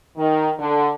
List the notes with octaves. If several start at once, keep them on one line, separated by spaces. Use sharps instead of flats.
D#3
D3